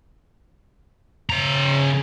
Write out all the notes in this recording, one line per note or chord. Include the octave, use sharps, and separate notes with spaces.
C#3 A#5